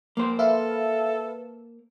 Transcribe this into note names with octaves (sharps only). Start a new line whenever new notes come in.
A#3 C5
A4 B4 E5 F5